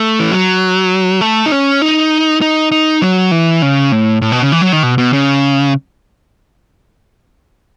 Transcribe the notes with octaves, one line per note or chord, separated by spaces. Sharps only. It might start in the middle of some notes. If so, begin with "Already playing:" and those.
Already playing: A3
E3
F#3
A3
D#4
C#4
D#4
D#4
D#4
F#3
E3
C#3
A2
A2
B2
C#3
E3
F#3
D#3
B2
B2
C#3